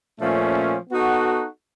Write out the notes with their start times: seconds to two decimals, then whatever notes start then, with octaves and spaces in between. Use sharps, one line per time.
0.21 A#2 F3 A3 C#4
0.90 B3 D#4 F#4 A4